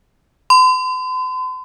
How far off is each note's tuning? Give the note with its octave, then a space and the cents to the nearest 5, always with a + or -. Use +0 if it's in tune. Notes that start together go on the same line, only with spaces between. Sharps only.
C6 -45